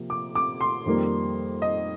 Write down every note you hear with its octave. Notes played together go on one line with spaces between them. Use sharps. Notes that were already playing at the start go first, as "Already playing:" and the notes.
Already playing: C3 F3 A#3
D6
D6
C6
F2 D#3 G3 A#3
D#5